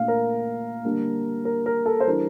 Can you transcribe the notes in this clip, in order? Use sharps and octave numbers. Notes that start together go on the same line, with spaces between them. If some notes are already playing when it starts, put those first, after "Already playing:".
Already playing: A#2 A3 D4 F5
A#4
D3 G3 A#3 D4
A#4
A#4
A4
C5
E3 G3 D4 A#4